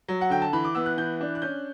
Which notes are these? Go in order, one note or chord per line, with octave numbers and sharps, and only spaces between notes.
F#3
F#5
D3 G5
A5
E3 B5
D6
B3 E6
F#6
E3 G6
D4
F#6
C#4 G6